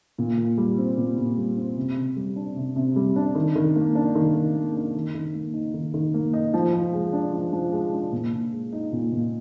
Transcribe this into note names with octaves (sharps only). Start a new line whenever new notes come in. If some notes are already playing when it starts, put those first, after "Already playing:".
A#2
A#2
G3
C4
A#2
A#2
G3
C4
C3
C3
G3
D4
C3
C3
G3
D4
D#3
D#3
A#3
D4
D#3
D#3
A#3
D4
D#3
D#3
A#3
D#4
D#3
D#3
A#3
D#4
F3
F3
G#3
D4
F3
F3
G#3
D4
A#2
A#2
G#3
D#4
A#2
A#2